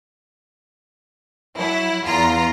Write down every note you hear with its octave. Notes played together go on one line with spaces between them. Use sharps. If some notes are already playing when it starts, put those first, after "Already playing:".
F#3 E4
E2 F4 A#5